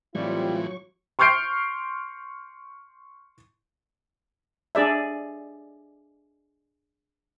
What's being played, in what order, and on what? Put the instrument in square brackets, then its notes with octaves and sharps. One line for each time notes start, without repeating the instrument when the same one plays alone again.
[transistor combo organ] A2 E3 [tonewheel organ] F#3 C#6 [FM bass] G3 [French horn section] C4 F4
[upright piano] C6 C#6 F6 G6 C7 D7
[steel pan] D4 G#4 D5 E5